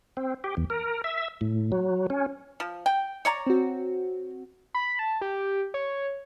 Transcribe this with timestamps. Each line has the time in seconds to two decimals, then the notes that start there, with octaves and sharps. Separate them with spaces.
0.17 C4
0.44 G4
0.57 E2
0.70 A#4
1.04 E5
1.41 A2
1.72 F#3
2.10 C#4
2.60 F3
2.86 G5
3.25 C#5 D5 A#5
3.47 C4 F#4
4.75 B5
4.99 A5
5.21 G4
5.74 C#5